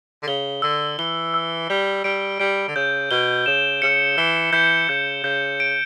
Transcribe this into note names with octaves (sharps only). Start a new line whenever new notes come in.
D3
C#3 G7
D3 E6
E3 G7
E6
G3 G7
G3 D7
G3 D7
D3
C#3 G6
B2 G7
C#3 E7
C#3 C#7
E3 G7
E3 G6
C#3 G6
C#3 G6
D7